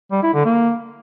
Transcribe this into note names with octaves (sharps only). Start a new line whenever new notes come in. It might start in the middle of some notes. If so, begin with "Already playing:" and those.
G3
E4
D3
A#3